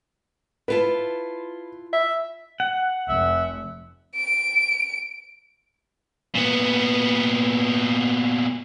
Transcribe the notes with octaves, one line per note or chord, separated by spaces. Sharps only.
E4 F4 B4 A5
E5
F#5
F1 E5
D7
A#2 B3